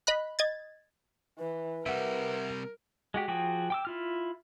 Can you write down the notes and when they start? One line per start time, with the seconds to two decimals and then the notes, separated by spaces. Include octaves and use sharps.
0.07 D#5 B5 F#6
0.39 D#5 G#6 A6
1.39 E3 B4
1.86 C3 G3 A#4 E5 F#5
3.14 G#3 F#4 G4
3.28 F3 F#4 G#4 G5 D6
3.70 G5 D6 E6
3.85 E4 F4 F6